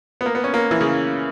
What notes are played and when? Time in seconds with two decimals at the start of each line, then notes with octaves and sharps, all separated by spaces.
0.21 B3
0.26 A#3
0.35 B3
0.44 C#4
0.54 A#3
0.71 E3
0.81 C#3